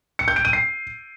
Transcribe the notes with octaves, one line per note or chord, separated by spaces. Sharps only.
C#7
G6
D7
D#7
C7